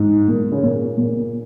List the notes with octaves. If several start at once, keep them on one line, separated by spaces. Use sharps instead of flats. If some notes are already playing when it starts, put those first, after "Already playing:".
Already playing: G#2
A#2
C#3
A#2
A#2